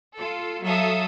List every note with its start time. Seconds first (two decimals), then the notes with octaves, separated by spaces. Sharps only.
0.18 F4 A4
0.65 F#3 A4 E5 F5 D#6